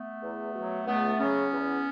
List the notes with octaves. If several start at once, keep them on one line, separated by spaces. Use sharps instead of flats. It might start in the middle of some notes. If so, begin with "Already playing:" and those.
Already playing: A3 B3
E2
B2 F#3
C#2 A3 B3
C#3 F#3 B3 C#4
E2